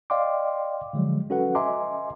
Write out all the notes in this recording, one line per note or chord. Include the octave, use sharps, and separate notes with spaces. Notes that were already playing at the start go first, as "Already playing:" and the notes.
D5 D#5 F5 G5 C6 D6
D3 F3 F#3 G#3
C#4 F#4 A4 B4 F#5
D#5 E5 G#5 A#5 C6 D6